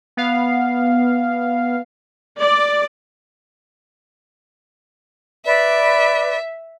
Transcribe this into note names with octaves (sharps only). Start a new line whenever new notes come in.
B3 F5
D5
B4 D5 E5